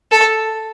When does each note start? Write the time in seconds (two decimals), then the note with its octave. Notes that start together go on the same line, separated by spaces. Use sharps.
0.11 A4